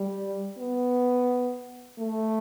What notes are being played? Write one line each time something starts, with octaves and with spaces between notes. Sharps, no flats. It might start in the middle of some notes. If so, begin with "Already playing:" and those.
Already playing: G3
B3
A3